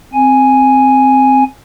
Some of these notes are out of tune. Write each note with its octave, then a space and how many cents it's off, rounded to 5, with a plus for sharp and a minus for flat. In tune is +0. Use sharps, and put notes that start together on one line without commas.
C4 +0 G#5 +0